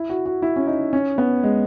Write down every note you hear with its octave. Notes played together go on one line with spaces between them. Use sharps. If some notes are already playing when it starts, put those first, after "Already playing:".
Already playing: E4
F#4
F#4
E4
C#4
D#4
C#4
B3
G#3